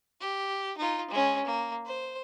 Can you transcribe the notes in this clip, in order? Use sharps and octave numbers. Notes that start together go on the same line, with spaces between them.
G4
D#4 F4
G#3 C#4
A#3
C5